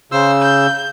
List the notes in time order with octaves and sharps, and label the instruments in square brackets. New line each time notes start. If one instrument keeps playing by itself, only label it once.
[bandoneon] C#3 E6 [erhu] C5
[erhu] G6